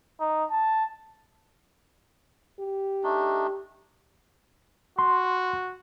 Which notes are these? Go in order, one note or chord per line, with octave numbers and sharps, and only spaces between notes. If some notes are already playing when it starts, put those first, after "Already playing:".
D#4
A5
G4
A3 D4 D#4
F#4 C6